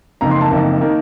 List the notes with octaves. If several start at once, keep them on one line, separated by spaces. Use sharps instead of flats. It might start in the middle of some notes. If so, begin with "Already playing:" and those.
F#1 F2 D#3 A#3 A#5
C6
A5
F#1 F2 D#3 A#3
D#3 A#3